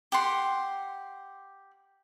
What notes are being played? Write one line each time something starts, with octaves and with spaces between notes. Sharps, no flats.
G4 F#5 C6